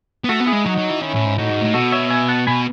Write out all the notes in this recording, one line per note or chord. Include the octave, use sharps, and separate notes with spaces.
B3
A3 F#4 A4
B3
E4 G#4
G#3
F#3 D#4 F#4
F#3
E3
D#3 C#4 E4
A2
G#2
A2 D#4 F#4
G#2
A2
B2 F#4 A4
C#5 E5
E5 G#5
F#5 A5
B2 G#5 B5